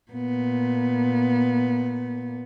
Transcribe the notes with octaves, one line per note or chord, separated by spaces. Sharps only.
A#2 B3